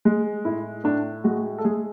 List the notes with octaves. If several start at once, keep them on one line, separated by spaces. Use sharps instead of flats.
G#3
A2 E4
A2 D4
G#3 F#4
A4
G#3 G#4